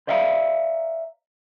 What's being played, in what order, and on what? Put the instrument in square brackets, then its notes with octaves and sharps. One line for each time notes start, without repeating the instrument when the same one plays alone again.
[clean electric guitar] C5 D5 E5 F5 A5 A#5